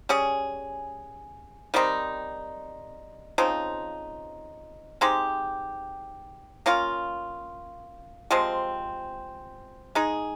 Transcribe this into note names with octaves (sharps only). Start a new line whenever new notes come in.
G3 C#4 G#4
D#3 G3 C4 D#4
C#3 F3 C4 D#4
G#3 C4 D#4 G4
A#3 C#4 F4
C3 F3 G#3 C4
G#3 D#4 G#4